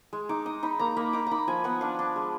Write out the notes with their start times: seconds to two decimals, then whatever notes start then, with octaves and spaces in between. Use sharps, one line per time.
0.13 G#3
0.29 D#4 D6
0.46 D#4 D#6
0.63 D#4 B5
0.79 A#3 A#5
0.96 A#3 B5
1.13 D#4 D6
1.27 D#4 A#5 B5
1.47 F3 G#5
1.64 B3 F#5
1.81 D4 F5
1.99 D4
2.16 G#3